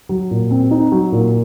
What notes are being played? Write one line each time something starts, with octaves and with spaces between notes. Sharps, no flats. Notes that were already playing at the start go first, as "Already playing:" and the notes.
F#3
A#2
C4
D#4
F#3
A#2